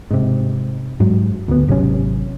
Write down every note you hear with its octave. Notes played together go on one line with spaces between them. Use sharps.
G#2 C3
G#2 F#3
D2 B3
G#1 C3 F#3 C#4